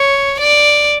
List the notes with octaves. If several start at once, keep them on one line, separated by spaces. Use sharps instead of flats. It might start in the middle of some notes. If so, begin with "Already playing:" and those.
Already playing: C#5
D5